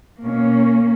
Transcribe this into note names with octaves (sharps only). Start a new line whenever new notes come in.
B2 A#3 C#4